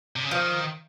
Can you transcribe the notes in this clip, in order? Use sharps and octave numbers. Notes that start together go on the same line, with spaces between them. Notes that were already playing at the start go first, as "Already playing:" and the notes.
C3
C#3
D#3 F3